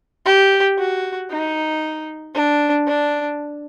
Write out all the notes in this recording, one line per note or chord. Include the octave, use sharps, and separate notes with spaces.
G4
F#4
D#4
D4
D4